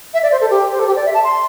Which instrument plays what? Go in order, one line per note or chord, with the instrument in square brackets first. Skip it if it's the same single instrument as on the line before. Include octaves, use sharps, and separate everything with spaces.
[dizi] E5
D5
C5
A4
G4
C5
A4
G4
D5
E5
A5
C6